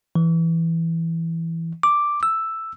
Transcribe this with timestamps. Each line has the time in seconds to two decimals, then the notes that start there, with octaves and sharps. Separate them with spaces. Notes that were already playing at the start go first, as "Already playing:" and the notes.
0.15 E3
1.83 D6
2.23 E6